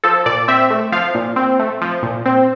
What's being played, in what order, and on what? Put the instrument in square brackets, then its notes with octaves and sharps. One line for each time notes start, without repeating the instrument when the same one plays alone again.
[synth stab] F3 A4
A#2 D5
C4 E5
A3
F3 F5
A#2
C4
A3
F3
A#2
C4